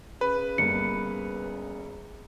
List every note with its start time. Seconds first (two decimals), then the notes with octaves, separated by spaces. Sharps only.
0.21 C#3 B4
0.58 G1 A#3 C#7